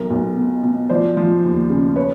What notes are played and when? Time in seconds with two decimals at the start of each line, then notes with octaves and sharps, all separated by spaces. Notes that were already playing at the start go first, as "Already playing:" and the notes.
Already playing: B1 A#4
0.10 B1
0.36 B2
0.63 B2
0.89 F3 C5 D5
1.17 F3
1.44 D#2
1.70 C#3
1.96 B4 C#5